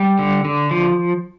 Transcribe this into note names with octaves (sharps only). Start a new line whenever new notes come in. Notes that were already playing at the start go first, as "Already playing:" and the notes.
Already playing: G3
D3
D3
F3